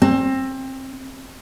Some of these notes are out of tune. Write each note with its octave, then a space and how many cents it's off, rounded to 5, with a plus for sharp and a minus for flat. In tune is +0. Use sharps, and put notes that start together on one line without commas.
C4 +25